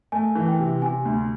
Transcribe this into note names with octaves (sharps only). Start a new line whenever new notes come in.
A3 G#5
E3
G5
C3
C3 G#5
D2